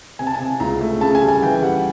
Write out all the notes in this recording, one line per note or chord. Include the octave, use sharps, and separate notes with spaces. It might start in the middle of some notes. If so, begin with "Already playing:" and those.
C3 G#5
A5
G#5
C3
C#2 A#5
A3
C#3 A5
G#5
G3
G#5
E3 G5
G3 F#5